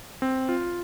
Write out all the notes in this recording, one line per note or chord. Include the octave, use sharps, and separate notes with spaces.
C4
F4